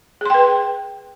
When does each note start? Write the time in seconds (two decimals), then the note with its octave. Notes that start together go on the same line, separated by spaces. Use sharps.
0.21 G#4
0.26 C6
0.30 G5
0.34 B4